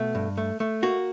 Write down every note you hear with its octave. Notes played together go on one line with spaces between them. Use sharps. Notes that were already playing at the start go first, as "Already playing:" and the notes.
Already playing: B2 A3
G2
A3
A3
A#3 F#4